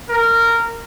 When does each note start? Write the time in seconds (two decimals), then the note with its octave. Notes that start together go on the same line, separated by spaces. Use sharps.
0.09 A#4